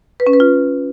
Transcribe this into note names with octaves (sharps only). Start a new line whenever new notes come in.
B4
C#4
B4
F4